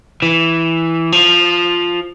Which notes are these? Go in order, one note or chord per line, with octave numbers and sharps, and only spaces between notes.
E3
F3